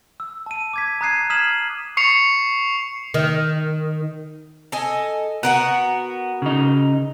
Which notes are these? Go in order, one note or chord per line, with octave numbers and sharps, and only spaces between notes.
E6
A5 D#7
D6 G#6 B6
A#5 D#6 F#6 G#6 C7 D#7
D#6 F6 G#6 B6 E7 F#7
C#6 C7 C#7 F7
D#3
A4 D#5 G#5
B3 F#4 A#4 F#5
C#3 D#4